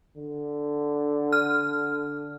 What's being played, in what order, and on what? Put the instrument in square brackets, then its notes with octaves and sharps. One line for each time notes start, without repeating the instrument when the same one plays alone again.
[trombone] D3
[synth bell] F6